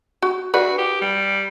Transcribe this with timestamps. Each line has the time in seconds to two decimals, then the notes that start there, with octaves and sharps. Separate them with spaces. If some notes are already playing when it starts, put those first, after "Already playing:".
0.22 F#4
0.54 F#4 B4 D5
0.78 G4
1.01 G3